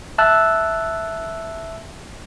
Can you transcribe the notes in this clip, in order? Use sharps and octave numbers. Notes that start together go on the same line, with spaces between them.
E5 A5 E6 F#6